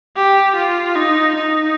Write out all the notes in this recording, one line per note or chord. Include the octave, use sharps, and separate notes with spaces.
G4
F4
D#4
D#4